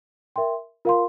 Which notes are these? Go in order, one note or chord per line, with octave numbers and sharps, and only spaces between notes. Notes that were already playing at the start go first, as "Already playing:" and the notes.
A#4 E5 G5 C6
F4 A#4 F5 C6